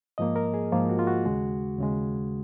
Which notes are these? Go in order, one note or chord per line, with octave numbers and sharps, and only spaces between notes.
G#2 F3 A#3 D#5
A#4
G#4
G#2 F3 A#3 F4
F#4
F4
F#4
D#2 C#3 G#3
D#2 C#3 G#3